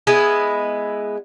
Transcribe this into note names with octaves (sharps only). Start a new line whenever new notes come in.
G#3 B3 E4